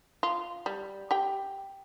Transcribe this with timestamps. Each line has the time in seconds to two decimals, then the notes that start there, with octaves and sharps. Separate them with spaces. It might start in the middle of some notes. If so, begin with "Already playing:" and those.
0.23 F4
0.66 G3
1.11 G4 G5